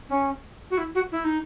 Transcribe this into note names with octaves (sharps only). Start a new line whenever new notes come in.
C#4
F#4
E4
F#4
E4
D#4